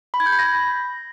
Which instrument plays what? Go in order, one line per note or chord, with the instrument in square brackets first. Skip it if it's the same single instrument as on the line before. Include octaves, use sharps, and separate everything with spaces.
[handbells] B5
G#6
G6
B5
A#6